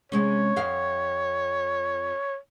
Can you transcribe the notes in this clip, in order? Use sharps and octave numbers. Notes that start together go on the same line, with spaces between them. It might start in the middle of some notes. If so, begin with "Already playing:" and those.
C3 G#3 C#4 C#5
F2 F5